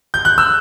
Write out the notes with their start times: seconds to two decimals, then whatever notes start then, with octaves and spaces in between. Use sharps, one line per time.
0.14 G6
0.25 F#6
0.38 E6